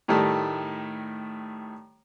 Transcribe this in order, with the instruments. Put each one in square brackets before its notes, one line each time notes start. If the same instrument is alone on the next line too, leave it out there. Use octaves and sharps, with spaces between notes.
[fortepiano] A2 D#3 G3 A3